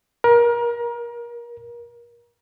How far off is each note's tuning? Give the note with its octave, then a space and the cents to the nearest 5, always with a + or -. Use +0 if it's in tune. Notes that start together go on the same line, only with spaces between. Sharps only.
A#4 +30